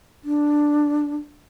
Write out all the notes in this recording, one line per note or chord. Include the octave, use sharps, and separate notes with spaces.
D4